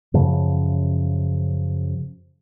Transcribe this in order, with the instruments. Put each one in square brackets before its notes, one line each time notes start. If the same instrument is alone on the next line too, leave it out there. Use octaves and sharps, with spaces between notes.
[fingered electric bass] F#2 C#3 F3